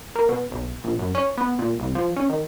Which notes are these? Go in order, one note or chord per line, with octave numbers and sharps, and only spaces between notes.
A#3
B2
B1
A#1
F#2
C#4
B3
A#2
C2
F3
C#4
D#3